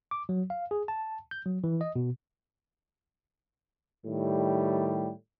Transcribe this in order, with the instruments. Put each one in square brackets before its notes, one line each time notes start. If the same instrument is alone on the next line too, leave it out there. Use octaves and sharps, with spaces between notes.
[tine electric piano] D6
F#3
F5
G#4
A5
G6
F#3
E3
D#5
B2
[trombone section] A2 D#3 G3